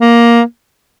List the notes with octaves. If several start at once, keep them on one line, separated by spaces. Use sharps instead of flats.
A#3